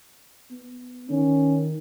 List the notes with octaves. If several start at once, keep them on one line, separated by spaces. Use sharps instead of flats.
B3
D#3 C#4